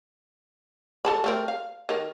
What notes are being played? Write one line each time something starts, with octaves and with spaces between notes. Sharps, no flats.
A4 A5 B5
A3 C4 A#4
F5
D#3 A#4